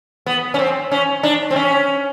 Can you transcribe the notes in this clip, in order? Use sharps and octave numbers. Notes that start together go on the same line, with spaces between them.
B3
C#4
C4
C#4
D4
C4
C#4